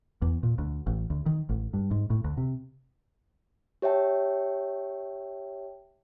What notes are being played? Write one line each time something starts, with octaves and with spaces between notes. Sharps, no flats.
E2
A#2
D2
A1
D2
D#3
A1
G2
G#2
A2
D2
C3
G4 C#5 E5 G5 A5